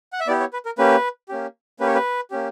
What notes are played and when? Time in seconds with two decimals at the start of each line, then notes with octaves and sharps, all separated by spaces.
0.13 F#5
0.20 E5
0.27 B3 E4 G4 D5
0.40 C#5
0.53 B4
0.65 A#4
0.78 A#3 C#4 G4 B4
1.29 A#3 C#4 G4
1.80 A#3 C#4 G4 B4
1.87 C#5
1.94 B4
2.31 A#3 C#4 G4